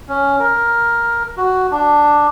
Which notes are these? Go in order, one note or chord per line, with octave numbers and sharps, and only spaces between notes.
C#4
A#4
F#4
D4